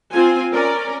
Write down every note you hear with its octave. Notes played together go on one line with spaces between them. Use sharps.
C4 F4 G#5
C#4 A#4 D5